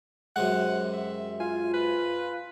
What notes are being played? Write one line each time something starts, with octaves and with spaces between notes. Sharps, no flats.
F#2 C3 G#3 F#5
E5
F4 G#5
B4